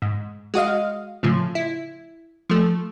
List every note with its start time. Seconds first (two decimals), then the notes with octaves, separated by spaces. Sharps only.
0.02 G#2
0.54 G#3 F#4 D#5 F5
1.23 A2 C#3 F3
1.55 E4
2.50 F3 A3